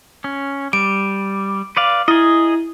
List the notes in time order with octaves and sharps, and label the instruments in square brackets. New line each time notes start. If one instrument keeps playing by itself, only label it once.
[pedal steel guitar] C#4
[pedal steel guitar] G3 [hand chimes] D7
[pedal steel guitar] B4 D5 F5
[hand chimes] E4 [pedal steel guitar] G#4 D#5